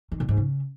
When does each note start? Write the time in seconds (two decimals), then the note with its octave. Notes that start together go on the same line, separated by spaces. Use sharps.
0.12 D#3
0.20 A#2
0.29 G#2
0.37 C#3